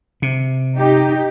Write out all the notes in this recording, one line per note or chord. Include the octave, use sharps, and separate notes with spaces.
C3
D#4 G4